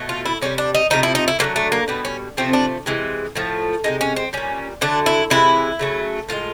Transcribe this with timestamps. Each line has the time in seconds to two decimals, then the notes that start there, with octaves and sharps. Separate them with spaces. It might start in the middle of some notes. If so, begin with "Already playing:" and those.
Already playing: B2 F#3 A3
0.09 F4
0.26 E4
0.42 C3 D#3 G3 C#4
0.58 D4
0.75 D#4
0.90 C3 F3 A3 D#4
1.03 E4
1.15 D#4
1.28 E4
1.39 D3 F#3 A3 A#3
1.56 A3
1.72 A#3
1.88 B2 G3 B3
2.05 C#4
2.37 C3 F3 A3 C4
2.53 D4
2.86 C3 E3 G#3
3.35 A2 F3 A3
3.84 C3 D#3 G#3 D#4
4.01 C#4
4.16 C4
4.33 A#2 G3 C#4
4.81 D3 F#3 A3 D4
5.06 E4
5.30 C3 E3 G#3 E4
5.79 C#3 F#3 A3
6.29 A2 F3 G#3 F4